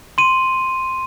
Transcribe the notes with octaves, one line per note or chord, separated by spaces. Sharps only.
C6 D#7